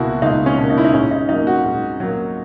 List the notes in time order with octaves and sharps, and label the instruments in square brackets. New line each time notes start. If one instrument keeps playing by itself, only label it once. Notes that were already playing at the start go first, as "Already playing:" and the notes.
Already playing: [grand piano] C#2 B2 A#3 E4 F#4
C#2 D#4
C#4
B2 A#3
D#4
E4
D#4
G#2 C#4
D#4
F#3 A#3 D#4
F#4
G#2
F#3 A#3